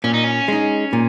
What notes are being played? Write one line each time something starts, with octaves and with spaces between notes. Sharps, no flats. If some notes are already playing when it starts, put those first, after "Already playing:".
A#2 C#4
D#4
C#4
G#3 D#4
A#2